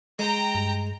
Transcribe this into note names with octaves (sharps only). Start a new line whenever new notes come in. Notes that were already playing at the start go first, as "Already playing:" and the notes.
G#3 G5 A#5
G2